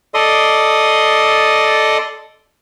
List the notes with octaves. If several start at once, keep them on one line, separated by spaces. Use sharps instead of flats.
A4 D5 D#5 C6 D#6